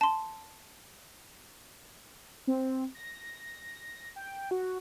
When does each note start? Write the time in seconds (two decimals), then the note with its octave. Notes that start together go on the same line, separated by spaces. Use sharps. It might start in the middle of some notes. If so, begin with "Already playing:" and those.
0.01 A5 C6
2.47 C4
2.95 A#6
4.16 G5
4.51 F#4